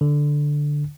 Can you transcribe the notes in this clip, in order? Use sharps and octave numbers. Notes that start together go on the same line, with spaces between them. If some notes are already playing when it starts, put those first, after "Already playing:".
D3